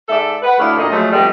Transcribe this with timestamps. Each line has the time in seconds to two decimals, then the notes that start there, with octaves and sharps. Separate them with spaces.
0.08 G#2 A4 D5 E5
0.42 B4 F#5
0.58 D2 A3 E4 C#5 D5 F5
0.78 D2 A#2 A3 D#4 D#5
0.91 F3 F#3 G#3 A3
1.12 F3 G3 A3 B3 C4 D#5